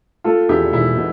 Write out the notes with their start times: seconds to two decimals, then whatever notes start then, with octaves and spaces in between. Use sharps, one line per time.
0.24 A3 F4 A4
0.49 E2 E4 G4
0.72 E1 E4
0.97 B2